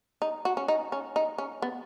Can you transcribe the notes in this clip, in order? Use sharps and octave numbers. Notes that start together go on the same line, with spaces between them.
D#4
F#4
C#4
D#4
C#4
D#4
C#4
B3